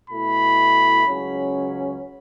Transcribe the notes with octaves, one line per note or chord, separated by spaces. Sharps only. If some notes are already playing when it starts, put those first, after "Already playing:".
B2 A3 E4 B5
C#2 C#3 F#3 C#4